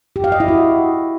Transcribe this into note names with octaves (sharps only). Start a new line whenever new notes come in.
G4
F5
D#5
E4
F#4